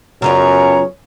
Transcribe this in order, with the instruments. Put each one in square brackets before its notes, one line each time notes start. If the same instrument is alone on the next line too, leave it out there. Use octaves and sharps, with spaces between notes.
[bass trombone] F#2 [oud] C#3 C#4 F4 [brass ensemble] F#3 B3 C#5 [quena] A#5